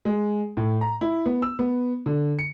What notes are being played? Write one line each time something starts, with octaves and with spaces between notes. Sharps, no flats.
G#3
A2
A#5
E4
B3
E6
B3
D3
C#7